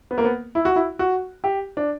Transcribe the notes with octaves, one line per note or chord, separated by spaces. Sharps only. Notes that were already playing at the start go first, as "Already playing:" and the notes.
B3
A#3
B3
E4
F#4
E4
F#4
G4
D4